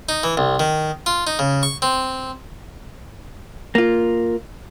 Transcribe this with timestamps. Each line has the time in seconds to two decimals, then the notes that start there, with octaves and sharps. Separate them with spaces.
0.09 D#4
0.23 E3
0.37 C2
0.60 D#3
1.06 F4
1.27 D#4
1.39 C#3
1.63 C#6
1.82 C4
3.75 A#3 F4